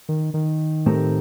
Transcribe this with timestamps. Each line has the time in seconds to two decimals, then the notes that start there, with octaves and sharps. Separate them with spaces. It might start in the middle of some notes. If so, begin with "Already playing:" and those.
0.09 D#3
0.34 D#3
0.86 A2 A3 C4 G4 A#4